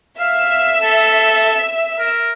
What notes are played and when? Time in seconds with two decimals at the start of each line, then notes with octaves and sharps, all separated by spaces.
0.20 E5 F5
0.82 A4
1.99 A#4